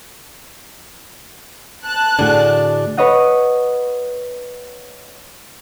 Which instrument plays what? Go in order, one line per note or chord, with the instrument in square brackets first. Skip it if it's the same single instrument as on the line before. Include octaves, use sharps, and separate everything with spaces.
[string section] A5 F#6
[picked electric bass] A2 D3 [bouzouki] D4 F#4 G#4
[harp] B4 C#5 D#5 F#5